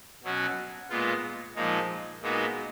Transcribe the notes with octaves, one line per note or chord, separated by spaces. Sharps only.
B2 F#3 C#4 F#4
A#2 G#3 B3 F4
A#2 F3 G#3 D#4
A#2 G#3 B3 D#4 F#4